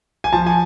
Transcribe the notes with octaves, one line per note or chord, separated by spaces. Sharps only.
G#5
F3 A5
G#5